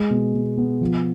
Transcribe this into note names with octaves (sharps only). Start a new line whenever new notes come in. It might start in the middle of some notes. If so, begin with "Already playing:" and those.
Already playing: G#3
B2
B2
B3
F3